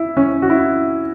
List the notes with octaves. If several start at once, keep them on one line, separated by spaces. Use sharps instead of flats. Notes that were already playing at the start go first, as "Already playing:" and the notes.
Already playing: E4
C#4
F#4
E4